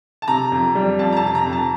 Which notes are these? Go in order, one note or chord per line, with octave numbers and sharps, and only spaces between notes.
A5
C3 A#5
F2
G3
F2 A5
A#5
A5
C3
A#5
F2
A5